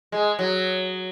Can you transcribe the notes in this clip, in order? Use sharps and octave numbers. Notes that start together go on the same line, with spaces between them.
G#3
F#3